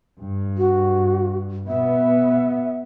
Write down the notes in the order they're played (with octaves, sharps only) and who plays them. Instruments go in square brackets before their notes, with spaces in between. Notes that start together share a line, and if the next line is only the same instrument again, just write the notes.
[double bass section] G2
[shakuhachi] F#4
[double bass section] B2 B3 [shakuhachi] E5